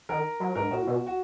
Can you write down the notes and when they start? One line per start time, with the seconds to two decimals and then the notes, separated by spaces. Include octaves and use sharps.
0.09 D#3 A#4
0.40 F#3
0.55 G#2 A#4
0.71 A#2 F#4
0.87 B2
1.07 F#4